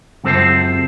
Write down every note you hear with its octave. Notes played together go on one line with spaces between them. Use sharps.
C#2 F#2 C4 A4 C5